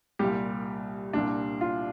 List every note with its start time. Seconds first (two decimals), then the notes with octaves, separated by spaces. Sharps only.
0.19 C2 A#2 G3 G4
1.13 C2 A#2 G3 D4
1.61 F4